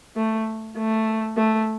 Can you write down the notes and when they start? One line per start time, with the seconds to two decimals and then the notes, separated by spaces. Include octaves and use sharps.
0.16 A3
0.77 A3
1.37 A3